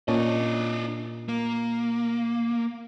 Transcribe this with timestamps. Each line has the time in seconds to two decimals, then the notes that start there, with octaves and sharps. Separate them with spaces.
0.08 A#2 C#4 D4 D#5 A5
1.28 A#3